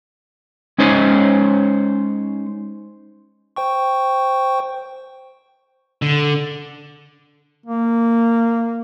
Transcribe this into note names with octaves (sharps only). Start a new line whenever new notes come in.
G#3 C#4 D#4 C5 C#5 D#5
C5 G5 C#6
D3
A#3